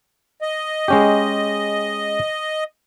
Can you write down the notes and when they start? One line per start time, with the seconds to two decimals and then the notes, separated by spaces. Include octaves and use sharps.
0.42 D#5
0.88 G#3 C#4 G4